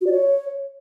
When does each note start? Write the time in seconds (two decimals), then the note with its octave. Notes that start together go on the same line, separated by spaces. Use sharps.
0.01 F#4
0.06 D5
0.12 C#5